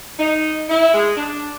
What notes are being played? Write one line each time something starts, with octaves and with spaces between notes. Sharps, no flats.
D#4
E4
G#3
D4